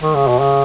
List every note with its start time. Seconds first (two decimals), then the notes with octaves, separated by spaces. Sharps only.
0.02 D#3
0.15 C#3
0.28 B2
0.41 C#3